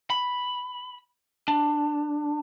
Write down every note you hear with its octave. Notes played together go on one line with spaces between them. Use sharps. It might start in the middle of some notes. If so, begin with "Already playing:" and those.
B5
D4